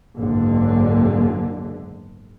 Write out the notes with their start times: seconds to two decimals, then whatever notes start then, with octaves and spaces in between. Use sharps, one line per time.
0.16 F#1 B1 G#2 D3